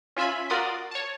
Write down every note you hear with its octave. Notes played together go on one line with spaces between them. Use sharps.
C#4 F4 E5 G#5 B5
F4 F#4 A#4 D5 C6 D#6
C#5 A5